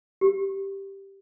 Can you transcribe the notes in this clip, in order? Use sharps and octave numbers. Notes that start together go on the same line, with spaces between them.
G4